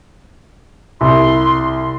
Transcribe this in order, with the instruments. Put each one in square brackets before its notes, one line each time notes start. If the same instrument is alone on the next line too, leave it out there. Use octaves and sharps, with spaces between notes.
[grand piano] C2 [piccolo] C6